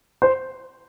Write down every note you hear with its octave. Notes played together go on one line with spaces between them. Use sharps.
C5